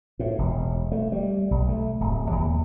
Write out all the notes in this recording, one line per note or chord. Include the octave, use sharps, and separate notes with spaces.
A2
E1
A3
G3
B1
A3
D1
D#2